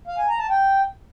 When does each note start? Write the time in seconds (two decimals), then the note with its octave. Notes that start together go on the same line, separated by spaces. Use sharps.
0.07 F5
0.18 G#5
0.28 A#5
0.39 A5
0.49 G5